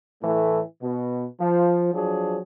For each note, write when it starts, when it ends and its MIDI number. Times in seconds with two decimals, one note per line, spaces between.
0.23 0.60 45
0.23 0.60 52
0.23 0.60 57
0.82 1.25 47
1.40 1.90 53
1.93 2.39 53
1.93 2.39 54
1.93 2.39 62
1.93 2.39 68